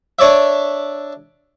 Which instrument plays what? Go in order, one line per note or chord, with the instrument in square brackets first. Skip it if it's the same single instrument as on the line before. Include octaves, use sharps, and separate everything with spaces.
[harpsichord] D4 C#5 D5 E5